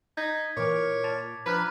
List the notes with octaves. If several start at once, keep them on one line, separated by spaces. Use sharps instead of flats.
D#4 G6 G#6 B6
A#2 E3 A#4 C#5 D6
A#2 A5 A6 F7
F3 D4 B4 A#5 B5 F6 F#6